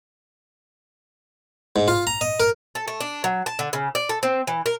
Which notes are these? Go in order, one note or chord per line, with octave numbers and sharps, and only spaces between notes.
G#2
F4
A#5
D#5
A#4
A4
A3
D4
F#3
A5
D3
C#3
D5
A4
C4
E3
A#4